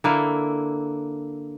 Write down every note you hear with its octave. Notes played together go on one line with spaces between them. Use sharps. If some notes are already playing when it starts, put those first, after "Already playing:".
D3 A#3 E4